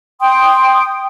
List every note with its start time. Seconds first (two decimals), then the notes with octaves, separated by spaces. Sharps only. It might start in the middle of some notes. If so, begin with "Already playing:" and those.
0.21 G5 C6 D#6